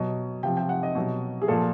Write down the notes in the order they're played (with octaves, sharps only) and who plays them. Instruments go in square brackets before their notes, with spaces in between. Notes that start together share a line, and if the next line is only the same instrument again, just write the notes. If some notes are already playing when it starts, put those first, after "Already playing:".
Already playing: [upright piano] B2 F#3 D#5
C3 F3 G5
G5
F#5
D#5
B2 F#3
G#4
A#2 F3 A4